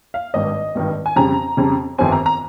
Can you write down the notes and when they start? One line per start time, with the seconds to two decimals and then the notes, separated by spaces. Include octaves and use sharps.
0.14 F5
0.34 G#1 G2 D#3 D#5
0.75 G#1 G2 D#3
1.06 G#5
1.16 F2 C#3 G3 A#5
1.57 F2 C#3 G3
1.98 G1 F2 D#3 G3 C4 G#5
2.12 A#5
2.26 A#5